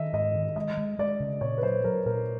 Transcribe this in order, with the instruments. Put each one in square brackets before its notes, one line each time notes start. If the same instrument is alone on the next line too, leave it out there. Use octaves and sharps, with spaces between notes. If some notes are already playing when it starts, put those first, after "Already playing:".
Already playing: [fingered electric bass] D#3 [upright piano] D#5 E5
[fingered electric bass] G#2 [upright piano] D#5
[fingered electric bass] D#3
[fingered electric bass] G#3 [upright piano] D#5
[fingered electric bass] G#3
[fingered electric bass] G#3 [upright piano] D5
[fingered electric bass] C#3
[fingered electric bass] A#2 [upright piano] C#5
[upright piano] B4
[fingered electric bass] F#3 [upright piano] C5
[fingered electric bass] F#3 [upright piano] A#4
[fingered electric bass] A#2 [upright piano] A#4